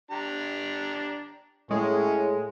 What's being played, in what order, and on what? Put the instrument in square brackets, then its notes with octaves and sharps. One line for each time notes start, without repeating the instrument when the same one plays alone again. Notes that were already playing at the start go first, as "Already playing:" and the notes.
[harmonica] D4 G4 A#5
[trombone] A2 [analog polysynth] G#3 [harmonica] C#4